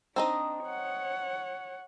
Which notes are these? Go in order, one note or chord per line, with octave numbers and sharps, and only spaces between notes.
C4 D4 D#4 D#5
C#5 F#5